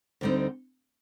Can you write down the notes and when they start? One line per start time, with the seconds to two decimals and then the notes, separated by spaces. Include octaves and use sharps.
0.21 D2 D3 G3 C4 D#4